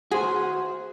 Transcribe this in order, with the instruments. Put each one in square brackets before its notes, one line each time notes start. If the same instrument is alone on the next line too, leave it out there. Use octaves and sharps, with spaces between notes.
[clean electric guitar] F#4 C5 [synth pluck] G#4